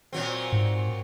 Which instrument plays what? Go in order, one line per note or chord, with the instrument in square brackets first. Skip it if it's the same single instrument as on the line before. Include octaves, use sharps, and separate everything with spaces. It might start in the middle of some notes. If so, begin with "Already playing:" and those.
[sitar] A#2 F#3 C4
[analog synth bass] G#2